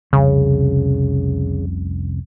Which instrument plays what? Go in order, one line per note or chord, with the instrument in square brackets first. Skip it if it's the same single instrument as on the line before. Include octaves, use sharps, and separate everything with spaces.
[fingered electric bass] F1 C2 C#4 [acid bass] C#3